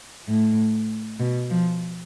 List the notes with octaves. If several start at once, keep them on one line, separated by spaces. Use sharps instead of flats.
A2
B2
F3